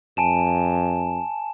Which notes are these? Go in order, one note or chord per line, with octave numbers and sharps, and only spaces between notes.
F2 G#5 A5 E7